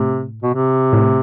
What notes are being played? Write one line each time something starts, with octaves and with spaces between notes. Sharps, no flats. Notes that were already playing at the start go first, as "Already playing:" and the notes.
Already playing: A2 C3
B2
C3
A2